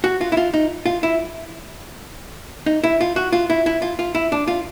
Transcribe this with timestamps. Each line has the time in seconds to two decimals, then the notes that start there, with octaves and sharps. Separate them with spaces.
0.04 F#4
0.21 F4
0.32 E4
0.37 F4
0.54 D#4
0.86 F4
1.03 E4
2.66 D#4
2.83 E4
3.01 F4
3.16 F#4
3.32 F4
3.50 E4
3.66 E4
3.82 F4
3.99 F4
4.15 E4
4.32 D4
4.48 F4